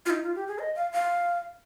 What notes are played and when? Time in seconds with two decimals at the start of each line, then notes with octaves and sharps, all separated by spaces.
0.06 F4
0.10 D#4
0.23 F4
0.35 G4
0.48 G#4
0.59 D#5
0.76 F5
0.93 F5